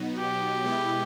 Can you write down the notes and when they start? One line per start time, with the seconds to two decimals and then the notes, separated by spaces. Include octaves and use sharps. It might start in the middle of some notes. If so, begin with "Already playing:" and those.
Already playing: B2 F#3 B3 D#4 F#4
0.19 G4
0.64 B2 G#3 B3 E4